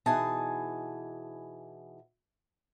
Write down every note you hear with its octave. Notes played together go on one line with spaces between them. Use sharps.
B2 E3 D#4 G#4 G#5 A5